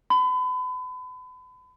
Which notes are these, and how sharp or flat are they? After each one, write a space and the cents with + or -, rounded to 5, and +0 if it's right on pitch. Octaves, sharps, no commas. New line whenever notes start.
B5 +35